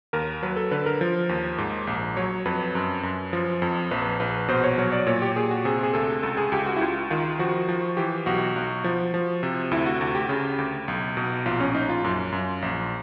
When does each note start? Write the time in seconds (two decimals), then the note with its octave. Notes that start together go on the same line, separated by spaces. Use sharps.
0.13 D#2 A#4
0.43 F#3 B4
0.56 A4
0.71 D3 B4
0.86 A#4
1.01 F3
1.29 D#2
1.58 G#2
1.87 A#1
2.17 F#3 C#5
2.45 F2 B4
2.75 F#2
3.03 F#2
3.33 F3
3.62 F2
3.91 A#1 B4
4.20 A#1 B4
4.48 B2 C5
4.64 C#5
4.78 F#3 C#5
4.92 D5
5.07 A#2 C#5
5.22 G4
5.36 A#2 G#4
5.51 F#4
5.65 C3 G#4
5.83 G#4
5.94 D2 A4
6.23 C#2 A4
6.37 G#4
6.52 C#2 G4
6.66 F#4
6.76 E4
6.81 C#2 F4
7.10 D#3 F4
7.39 F3 F#4
7.69 F3
7.97 E3 G4
8.26 B1 F#4
8.56 B1
8.84 F3
9.14 F3
9.43 C3
9.71 D2 E4
9.86 F#4
10.00 D2 F#4
10.15 G4
10.29 C#3
10.58 D2
10.88 B1
11.17 B2
11.46 A#1 F4
11.60 C#4
11.74 A#1 D#4
11.89 F4
12.04 F#2
12.32 F#2
12.62 A#1